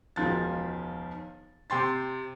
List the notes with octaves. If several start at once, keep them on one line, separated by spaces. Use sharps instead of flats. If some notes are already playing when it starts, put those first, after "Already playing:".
E1 C#2 D#3 F3 A6
C3 G5 C6 A6